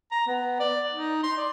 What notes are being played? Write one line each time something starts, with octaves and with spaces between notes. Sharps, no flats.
A#5
B3
D5
D#4
C6
D5